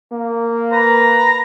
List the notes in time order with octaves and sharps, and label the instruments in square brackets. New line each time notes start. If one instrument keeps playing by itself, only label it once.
[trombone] A#3
[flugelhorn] B4 [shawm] A#5